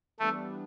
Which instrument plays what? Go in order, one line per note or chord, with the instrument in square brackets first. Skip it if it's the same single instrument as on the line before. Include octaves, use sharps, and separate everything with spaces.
[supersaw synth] E3 G3 B3 D4 [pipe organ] A3